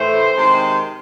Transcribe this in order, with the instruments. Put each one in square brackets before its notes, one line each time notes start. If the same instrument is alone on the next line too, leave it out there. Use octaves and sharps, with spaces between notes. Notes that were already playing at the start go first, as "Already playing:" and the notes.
Already playing: [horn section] A2 E3 A3 C5
C3 D#3 G#3